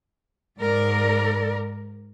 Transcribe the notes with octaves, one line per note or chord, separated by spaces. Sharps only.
G#2 A#4 D5